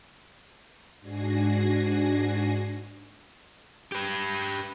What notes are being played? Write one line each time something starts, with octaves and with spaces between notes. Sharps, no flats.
G#2 D4 F#4 G#5 A#6 C7
G4 B4